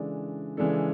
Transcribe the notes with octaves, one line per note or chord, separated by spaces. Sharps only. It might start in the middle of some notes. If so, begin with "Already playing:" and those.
Already playing: C#3 E3 G#3 D4 A4
C#3 E3 G#3 D4 A4